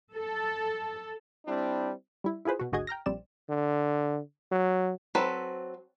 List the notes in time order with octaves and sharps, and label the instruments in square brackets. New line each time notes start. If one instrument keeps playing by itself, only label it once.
[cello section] A4
[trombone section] G3 C4 D4 E4
[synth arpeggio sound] G3 E4
E4 F4 G#4 B4 C5
B2 F#4
G#1 D2 F#4 G#4 D#5 G#6
G5 A#5 F6 A#6
A#1 G3 C4 D5 E7
[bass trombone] D3
F#3
[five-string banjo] F#3 C4 A4 B4